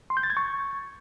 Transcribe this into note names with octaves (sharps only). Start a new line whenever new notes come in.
C6
G6
A6
G#6
C#6